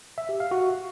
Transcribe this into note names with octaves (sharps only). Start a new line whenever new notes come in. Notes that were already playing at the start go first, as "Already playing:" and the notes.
E5
G4
F5
F#4